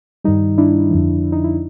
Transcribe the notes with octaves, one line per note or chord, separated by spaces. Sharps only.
G2 D#3 G3 D#4
D4 E4
F2 D3 F3
D#4
E4